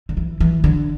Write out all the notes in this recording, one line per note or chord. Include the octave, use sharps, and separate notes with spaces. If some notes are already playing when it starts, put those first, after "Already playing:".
D3
E3
E3
D3